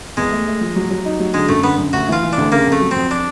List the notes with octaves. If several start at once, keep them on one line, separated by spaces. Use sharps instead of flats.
E2 G#3
A3
A3
F3
F#3
F#3
D#4
F#3
D3 G#3
F#2 A3
D3 B3
F#2
D2 F#4
E3 F4
E3
D4
D2
C#3 A#3
F2
A3
F#3
F2 C4
D4